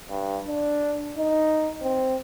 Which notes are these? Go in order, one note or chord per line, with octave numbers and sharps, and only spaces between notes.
G2
D4
D#4
C4